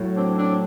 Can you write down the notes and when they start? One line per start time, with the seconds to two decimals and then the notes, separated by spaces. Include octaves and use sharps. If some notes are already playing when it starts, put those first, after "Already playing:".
Already playing: A2 F#3
0.15 C4 D4
0.36 C4 D4